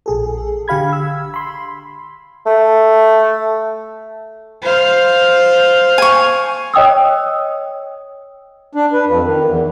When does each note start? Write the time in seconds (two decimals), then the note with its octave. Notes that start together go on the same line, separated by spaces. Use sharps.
0.06 A#1 G#4 A4
0.68 D3 G4 F5 B5 G#6
0.93 E6
1.34 B5 C6
2.46 A3
4.62 C5 F5
5.98 G#5 C#6
6.74 C#5 D#5 G5 D#6 E6
8.74 D4
8.93 B4
9.06 F2
9.24 D#3
9.44 E2